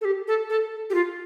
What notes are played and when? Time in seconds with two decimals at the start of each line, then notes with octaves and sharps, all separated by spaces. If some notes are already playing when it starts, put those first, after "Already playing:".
0.01 A4
0.05 G4
0.28 A4
0.50 A4
0.90 G4
0.94 F4